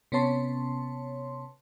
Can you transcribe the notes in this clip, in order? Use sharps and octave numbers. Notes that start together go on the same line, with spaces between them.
C3 B3 C#4 C#5 A5 C6